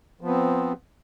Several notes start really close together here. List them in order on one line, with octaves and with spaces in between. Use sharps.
F3 B3 C4